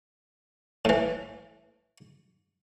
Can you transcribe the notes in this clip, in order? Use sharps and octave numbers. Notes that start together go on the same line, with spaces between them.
A2 E3